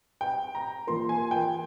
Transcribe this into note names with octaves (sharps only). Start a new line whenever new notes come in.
G5
A#5
E3 A#3 F4 A#4 C6
G#5
G5